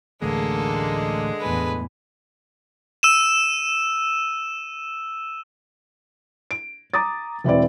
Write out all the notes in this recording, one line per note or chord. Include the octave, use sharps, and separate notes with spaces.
A1 D2 D3 G#3 A#3 A4
E2 A2 B4 G#5
E6 D#7 E7
D7
A#5 D6 D#6 A6
E1 E3 C4 D5